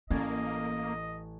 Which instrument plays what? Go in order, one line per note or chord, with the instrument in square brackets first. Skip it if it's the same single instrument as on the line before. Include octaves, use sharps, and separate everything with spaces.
[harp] A1 D5 G#6 [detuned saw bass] A#3 [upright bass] C#4 [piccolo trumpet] D#5